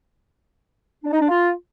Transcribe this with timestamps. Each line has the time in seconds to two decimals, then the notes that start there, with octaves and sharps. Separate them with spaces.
1.04 D4
1.12 D#4
1.20 D4
1.29 F4